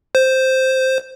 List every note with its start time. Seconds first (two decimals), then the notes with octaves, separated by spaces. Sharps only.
0.15 C5